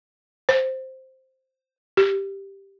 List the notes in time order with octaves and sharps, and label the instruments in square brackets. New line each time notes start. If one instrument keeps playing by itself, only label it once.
[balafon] C5
G4